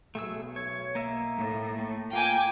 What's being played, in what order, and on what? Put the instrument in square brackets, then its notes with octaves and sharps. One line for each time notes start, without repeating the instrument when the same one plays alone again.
[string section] B1 [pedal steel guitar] A3 G#4 E6
[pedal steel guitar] C#5
A#3 D#5 E5
[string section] A2
[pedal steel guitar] A3
[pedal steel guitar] A#3 F4 [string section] G5 G#5 D6